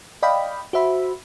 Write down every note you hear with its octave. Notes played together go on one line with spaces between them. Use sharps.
D5 D#5 F5 G5 B5
F#4 C5 E5 B5